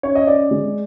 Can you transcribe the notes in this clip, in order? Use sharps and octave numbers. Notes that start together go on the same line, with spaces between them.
C#4 C#5
D#5
C#4 D5
G#3